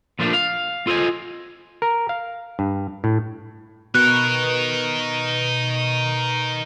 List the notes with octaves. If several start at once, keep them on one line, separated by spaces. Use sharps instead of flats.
A#2 F3 A3 A#3 D4
F5
F4 A4 C5 D#5 G#5
A#4
F5
G2
A2
B2 D#4 A#4 B4 C#6 F#6